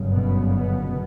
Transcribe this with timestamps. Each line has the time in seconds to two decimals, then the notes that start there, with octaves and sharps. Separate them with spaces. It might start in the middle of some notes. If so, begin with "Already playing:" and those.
Already playing: G1 F#2 C#3
0.11 B2 B3
0.52 B2 B3